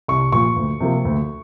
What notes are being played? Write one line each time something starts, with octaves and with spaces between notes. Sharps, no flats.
C2 C#6
A#2 F3 C#6
D2
C3 F3 A#3
D2